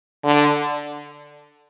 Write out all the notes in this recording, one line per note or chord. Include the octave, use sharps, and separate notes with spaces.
D3